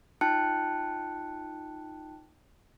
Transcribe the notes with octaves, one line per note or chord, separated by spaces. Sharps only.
D#4 F4 G5 A5 F#6 C#7